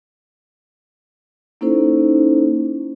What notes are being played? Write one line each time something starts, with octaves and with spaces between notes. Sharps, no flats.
A#3 C#4 D#4 E4 A4 C5